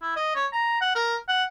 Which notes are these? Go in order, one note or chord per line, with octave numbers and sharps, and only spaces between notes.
E4
D#5
C#5
A#5
F#5
A#4
F#5